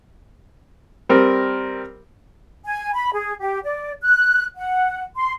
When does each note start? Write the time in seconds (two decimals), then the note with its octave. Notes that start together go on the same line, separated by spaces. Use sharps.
1.09 G3 C4 A#4
2.65 G#5
2.94 B5
3.13 G#4
3.41 G4
3.64 D5
4.02 F#6
4.57 F#5
5.16 C6